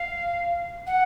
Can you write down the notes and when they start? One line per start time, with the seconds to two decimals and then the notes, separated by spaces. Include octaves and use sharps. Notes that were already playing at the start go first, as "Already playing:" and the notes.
Already playing: F5
0.87 F#5